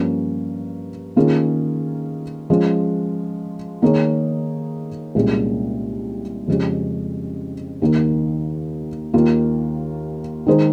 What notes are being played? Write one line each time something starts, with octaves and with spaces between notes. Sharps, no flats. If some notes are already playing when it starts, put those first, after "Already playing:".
Already playing: G2 F3 A#3 C#4
D#3 A#3 C#4 F4 G#4
F3 G#3 C#4
D#3 A#3 D#4 G#4 C#5
C2 A#2 G#3 C#4 G#4
F2 C#3 G#3 C#4 G4
D#2 D#3 A#3 D#4
D#2 D#3 A#3 F4
D#3 G#3 D#4 G#4 C5